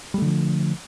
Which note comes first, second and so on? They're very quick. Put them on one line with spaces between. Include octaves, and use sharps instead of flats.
G3 A3 D3 F3